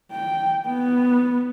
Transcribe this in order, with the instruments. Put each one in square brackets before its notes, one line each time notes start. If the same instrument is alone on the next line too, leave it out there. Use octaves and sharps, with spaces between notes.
[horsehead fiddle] G5
B3